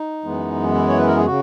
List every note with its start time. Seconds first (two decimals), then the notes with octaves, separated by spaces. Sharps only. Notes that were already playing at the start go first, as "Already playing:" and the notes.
Already playing: D#4
0.24 F#2 E3 G#3 B3
0.74 E4
0.88 C#5
0.97 B4
1.07 A#4
1.16 G#4
1.25 C#3 F#4